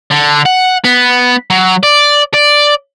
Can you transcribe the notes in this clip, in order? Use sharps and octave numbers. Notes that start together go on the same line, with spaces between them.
D3
F#5
B3
F#3
D5
D5